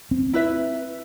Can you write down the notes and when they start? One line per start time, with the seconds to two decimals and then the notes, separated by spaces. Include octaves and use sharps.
0.11 C4
0.33 E4 B4 E5